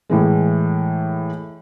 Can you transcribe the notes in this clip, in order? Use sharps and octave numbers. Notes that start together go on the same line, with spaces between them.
A2 E3 G#3